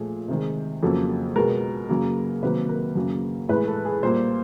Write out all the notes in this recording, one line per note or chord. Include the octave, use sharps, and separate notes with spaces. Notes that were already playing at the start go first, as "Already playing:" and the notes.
Already playing: A#2 F3 A3 G#4
C3 D#3 G#3
F2 C#3 F#3 A#3 A4
B2 G#3 A#4
F#2 C#3 F#3 A#3
C3 D#3 F#3 A#3 B4
A#4
F#2 C#3 F#3 A#3
A2 E3 G#3 B4
A4
G#4
A#2 G3 A#3 C5